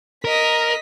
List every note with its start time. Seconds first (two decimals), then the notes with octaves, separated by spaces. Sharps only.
0.25 A#4 D#5 B6